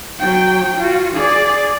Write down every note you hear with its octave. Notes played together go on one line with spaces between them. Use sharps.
F#3 G5
F4 F#4
G#4 D5